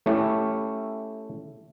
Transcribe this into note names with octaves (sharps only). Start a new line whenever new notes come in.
A3 C#4 E4 G4